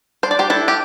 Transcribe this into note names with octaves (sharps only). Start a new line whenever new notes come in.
D4 C5
D5
G4 C5
D4 E4 A4
G4